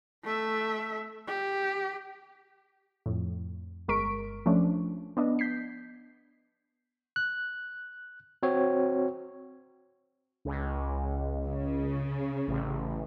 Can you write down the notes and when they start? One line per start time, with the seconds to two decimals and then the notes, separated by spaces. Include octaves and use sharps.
0.24 A3 E5
1.28 G4
3.06 F2 A2
3.88 G1 G#3 A#4 C#6 B6 D7
4.46 F3 A3 C#4 D4
5.17 B3 D4 D#5
5.39 G6 B6 C7
7.16 F#6
8.43 C4 F#4 C#5
10.45 C#2
11.46 C#3
12.47 A1